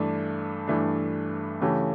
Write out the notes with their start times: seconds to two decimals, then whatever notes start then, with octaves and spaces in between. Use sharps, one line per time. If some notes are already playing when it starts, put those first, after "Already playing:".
Already playing: G2 E3 A3 D4
0.68 G2 E3 A3 D4
1.61 C#3 E3 A3 C#4 G4